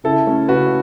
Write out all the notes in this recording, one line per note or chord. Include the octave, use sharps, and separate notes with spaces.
C#3 E4 A4
A3 C#4
C#3 F#4 B4